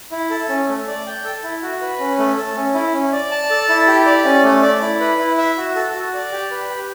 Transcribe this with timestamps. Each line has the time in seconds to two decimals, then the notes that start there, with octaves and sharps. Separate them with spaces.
0.11 E4
0.30 A4
0.49 C#4
0.69 A3
0.87 D5
1.06 G5
1.24 A4
1.43 E4
1.62 F#4
1.81 B4
1.99 C#4
2.18 A3
2.37 A4
2.56 C#4
2.74 E4
2.93 C#4
3.13 D5
3.31 A5
3.50 A4
3.69 E4
3.87 G4
4.06 D5
4.25 C#4
4.44 A3
4.62 D5
4.81 E4
5.00 B4
5.19 E4
5.38 E5
5.57 F#4
5.76 A4
5.95 F#4
6.14 D5
6.32 G4
6.51 B4
6.69 G4